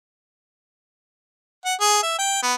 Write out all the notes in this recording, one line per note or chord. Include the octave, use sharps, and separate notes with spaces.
F#5
G#4
E5
G5
B3